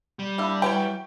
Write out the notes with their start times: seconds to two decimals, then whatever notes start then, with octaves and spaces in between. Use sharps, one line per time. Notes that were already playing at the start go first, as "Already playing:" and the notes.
0.19 G3
0.38 A#3 D4 E4
0.62 E3 F#3 C#5 G5